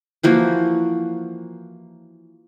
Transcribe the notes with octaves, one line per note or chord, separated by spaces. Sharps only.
E3 F3 A#3 F#4